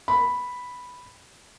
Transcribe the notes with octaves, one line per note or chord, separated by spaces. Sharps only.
B5